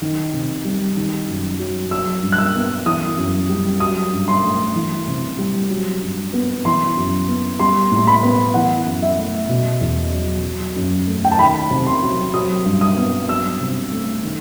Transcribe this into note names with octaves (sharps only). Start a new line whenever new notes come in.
D#3
C3
G3
D#3
F#2
F#3
F#3 E6
G2
F#6
E6
B3
E3 D#6
F#2
G3
F#3 D#6
G2
C6
A3
E3
C3
G3
F#3
G2
B3
E3 C6
F#2
B3
G3 C6
A2 C6
B5
B3
E3 F#5
F#2
E5
A3
B2
E2
F#3
F#3
F#2
A3
G5
A5
D#3 B5
C3
C6
F#3
F#3 D#6
G2
D#6
B3
F#3 E6
C3
A3
D#3